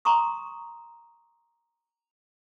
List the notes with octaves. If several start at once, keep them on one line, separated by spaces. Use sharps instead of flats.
A#5 C6 C#6 D#6